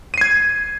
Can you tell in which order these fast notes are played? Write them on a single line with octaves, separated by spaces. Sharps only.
D#7 C7 G#6